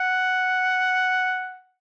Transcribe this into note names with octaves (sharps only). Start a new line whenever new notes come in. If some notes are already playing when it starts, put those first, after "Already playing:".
Already playing: F#5